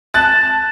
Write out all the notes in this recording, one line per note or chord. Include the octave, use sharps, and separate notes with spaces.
A5 F#6 A6